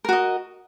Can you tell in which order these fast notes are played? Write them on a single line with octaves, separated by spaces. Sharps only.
A#4 F#4 D#5